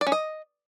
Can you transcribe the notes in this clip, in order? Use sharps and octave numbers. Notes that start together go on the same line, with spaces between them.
D5
C#4
D#5